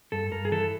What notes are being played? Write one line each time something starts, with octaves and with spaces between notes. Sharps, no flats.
G2 A4
G2 A#4
G#4
E3 A4